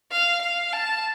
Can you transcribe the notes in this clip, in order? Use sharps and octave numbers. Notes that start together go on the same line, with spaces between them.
F5
F5
A5